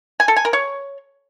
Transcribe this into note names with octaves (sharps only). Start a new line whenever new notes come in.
G#5
A4
G#5
A#4
C#5